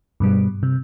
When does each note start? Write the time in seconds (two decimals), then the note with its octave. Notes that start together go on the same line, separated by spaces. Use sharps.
0.20 G2 B2 G3
0.63 C3